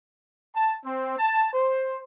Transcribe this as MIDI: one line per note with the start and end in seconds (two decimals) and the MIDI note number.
0.56 0.77 81
0.84 1.16 60
1.19 1.50 81
1.53 2.03 72